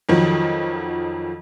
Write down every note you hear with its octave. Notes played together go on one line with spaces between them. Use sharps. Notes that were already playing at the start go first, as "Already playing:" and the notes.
F2 D#3 F3 F#3